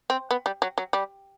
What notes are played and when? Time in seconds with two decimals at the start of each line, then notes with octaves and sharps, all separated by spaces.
0.10 C4
0.31 B3
0.46 G3
0.62 F#3
0.78 F#3
0.93 G3